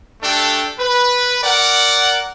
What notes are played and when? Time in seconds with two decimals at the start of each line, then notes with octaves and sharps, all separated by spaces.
0.21 A3 D4 G4 A4
0.78 B4
1.42 A#4 D5 F#5